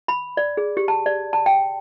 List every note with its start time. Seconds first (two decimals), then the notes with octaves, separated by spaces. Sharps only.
0.08 B5
0.37 D5
0.57 G#4
0.77 G4
0.88 A5
1.06 D5
1.33 A5
1.46 G5